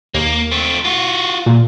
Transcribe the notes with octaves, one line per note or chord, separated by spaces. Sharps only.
D#2 A#3
A3 C4
F4 F#4
A#2